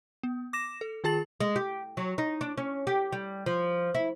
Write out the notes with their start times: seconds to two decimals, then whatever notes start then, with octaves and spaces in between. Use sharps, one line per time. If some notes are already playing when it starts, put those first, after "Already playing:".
0.23 B3
0.53 D6 A#6 E7
0.81 A4
1.04 D#3 F4 G#4 A5 A6 F#7
1.40 G#3
1.56 G4
1.97 F#3
2.18 D#4
2.41 D4
2.58 C#4
2.87 G4
3.12 G3
3.46 F3
3.95 E4